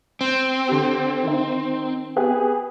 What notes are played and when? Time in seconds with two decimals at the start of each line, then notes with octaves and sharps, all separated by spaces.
0.21 C4
0.68 D3 G4
1.23 D#3 D#4
2.16 B3 G4 G#4